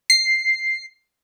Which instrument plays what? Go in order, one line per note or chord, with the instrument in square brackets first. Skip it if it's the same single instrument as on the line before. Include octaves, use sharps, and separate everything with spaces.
[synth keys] C7